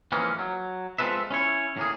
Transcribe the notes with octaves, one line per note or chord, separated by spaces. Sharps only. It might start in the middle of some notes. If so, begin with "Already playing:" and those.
F2 E3 G#3 A#3 C#4
F#3
G#3 C4 F4 A4 B4 E5
C#4 E4 C#5
A2 A#3 G#4